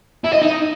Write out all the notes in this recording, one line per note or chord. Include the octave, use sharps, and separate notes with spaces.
E4
D#5
D#4